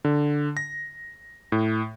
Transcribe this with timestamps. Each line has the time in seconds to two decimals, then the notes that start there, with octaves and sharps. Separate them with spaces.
0.05 D3
0.57 A#6
1.52 A2